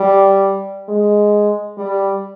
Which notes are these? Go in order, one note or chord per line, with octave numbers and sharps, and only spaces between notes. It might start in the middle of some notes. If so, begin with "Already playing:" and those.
Already playing: G3
G#3
G3